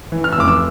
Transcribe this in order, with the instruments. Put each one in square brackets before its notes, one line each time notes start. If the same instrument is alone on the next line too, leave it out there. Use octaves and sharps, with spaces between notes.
[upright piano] E3
F6
E6
F1 D6
E6